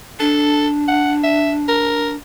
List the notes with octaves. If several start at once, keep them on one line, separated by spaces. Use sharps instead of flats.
D4 A4
F#5
E5
A#4